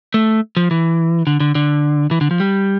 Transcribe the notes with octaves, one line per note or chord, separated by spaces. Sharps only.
A3
F3
E3
D3
D3
D3
E3
D3
F3
G3